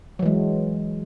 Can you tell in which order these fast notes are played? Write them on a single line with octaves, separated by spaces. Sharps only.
F#3 E3 G#3